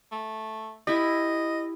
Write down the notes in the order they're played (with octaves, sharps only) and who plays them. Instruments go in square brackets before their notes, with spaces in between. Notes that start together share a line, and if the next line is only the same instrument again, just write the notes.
[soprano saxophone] A3
[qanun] E4 G4 [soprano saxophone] D#5